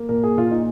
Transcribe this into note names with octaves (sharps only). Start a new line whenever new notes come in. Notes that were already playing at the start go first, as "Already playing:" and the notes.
Already playing: A#3
A#2 A#4
G#4
A#2 F4
D#4